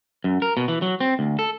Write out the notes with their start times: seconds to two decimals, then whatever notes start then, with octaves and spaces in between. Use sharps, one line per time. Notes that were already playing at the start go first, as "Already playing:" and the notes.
0.24 F#2
0.42 A#4
0.57 B2
0.68 E3
0.82 F#3
1.00 C4
1.19 D2
1.39 A4